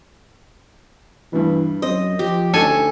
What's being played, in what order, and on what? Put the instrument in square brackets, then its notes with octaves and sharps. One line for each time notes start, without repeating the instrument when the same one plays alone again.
[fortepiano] G2 B2 [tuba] E3
[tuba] F#2 [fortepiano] C4 [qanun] D#5
[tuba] F3 [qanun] G4
[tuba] D2 [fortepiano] C#4 D#4 [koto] A4 G#5